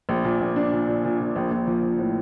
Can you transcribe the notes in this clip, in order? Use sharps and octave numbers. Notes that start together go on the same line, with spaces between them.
A#1
A#2
A#1
D4
A#2
A#2
A#2
A#2
A#1
A#1
F3
F3
A2